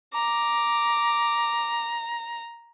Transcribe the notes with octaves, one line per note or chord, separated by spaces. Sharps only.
A#5 D6